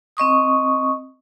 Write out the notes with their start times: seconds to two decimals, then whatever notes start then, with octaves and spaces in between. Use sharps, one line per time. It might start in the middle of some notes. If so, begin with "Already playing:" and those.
0.17 C4 D#5 C#6 D#6